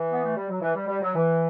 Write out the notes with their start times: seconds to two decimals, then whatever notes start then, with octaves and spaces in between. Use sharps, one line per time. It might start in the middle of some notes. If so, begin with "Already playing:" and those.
Already playing: E3
0.12 B3
0.24 A3
0.37 G3
0.49 F#3
0.61 E3
0.75 G3
0.88 G3
1.02 F#3
1.15 E3